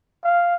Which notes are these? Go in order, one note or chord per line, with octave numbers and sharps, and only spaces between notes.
F5